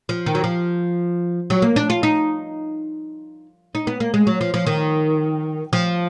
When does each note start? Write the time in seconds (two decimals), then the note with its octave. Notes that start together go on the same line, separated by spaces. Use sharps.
0.09 F3
0.26 D#3
0.35 F#3
0.44 F3
1.50 F#3
1.62 A#3
1.76 D4
1.90 F4
2.03 D#4
3.75 D#4
3.87 B3
4.00 A#3
4.14 G#3
4.27 F#3
4.41 F3
4.54 F3
4.67 D#3
5.73 F3